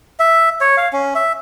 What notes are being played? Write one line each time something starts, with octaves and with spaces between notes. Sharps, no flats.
E5
C#5
F5
C#4
E5